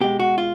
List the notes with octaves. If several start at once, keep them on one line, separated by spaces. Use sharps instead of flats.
B2 G#3 G4
F#4
F4